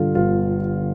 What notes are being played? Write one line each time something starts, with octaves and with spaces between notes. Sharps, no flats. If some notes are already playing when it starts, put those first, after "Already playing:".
Already playing: G2 D3 F4
G1 F4